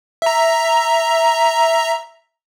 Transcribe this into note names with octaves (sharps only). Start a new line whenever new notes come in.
E5 A#5